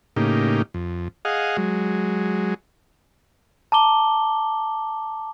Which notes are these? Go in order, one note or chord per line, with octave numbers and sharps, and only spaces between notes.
A2 C#3 A#3 D#4 G4
F2
G#4 D#5 F5 F#5
F#3 G#3
A5 A#5 D6 G7